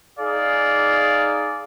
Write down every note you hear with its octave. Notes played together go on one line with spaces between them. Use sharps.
D#4 G#4 D5 F5